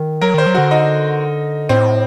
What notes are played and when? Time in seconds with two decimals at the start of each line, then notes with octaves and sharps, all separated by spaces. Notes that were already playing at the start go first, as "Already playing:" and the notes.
Already playing: D#3
0.21 F#3 A#4
0.34 D#3 C5
0.46 F#3
0.55 D3 F#4
0.71 D#4
1.69 A2 C4